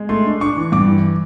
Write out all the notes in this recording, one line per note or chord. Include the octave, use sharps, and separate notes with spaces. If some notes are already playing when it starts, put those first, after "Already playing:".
Already playing: G#3
A3 C6
D4
D4 C#6
E3
G2 D6
E3